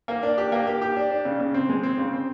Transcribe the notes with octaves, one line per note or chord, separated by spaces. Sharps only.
A#3
D4
G4
A#3
G4
G4
D4
D4
C#3
C#3
C4
G#3
C4
C#3
C4